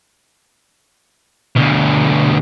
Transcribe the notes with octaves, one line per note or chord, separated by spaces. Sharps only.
D2 B2